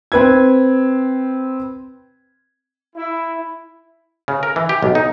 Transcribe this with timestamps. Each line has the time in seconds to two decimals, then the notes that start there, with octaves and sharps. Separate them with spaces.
0.12 C4 B4 G#6
2.96 E4
4.28 C#3
4.43 A#4
4.56 E3
4.69 G4
4.83 B1
4.95 D#4